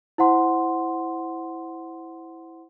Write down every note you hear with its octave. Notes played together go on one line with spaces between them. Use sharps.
E4 C5 F#5 C6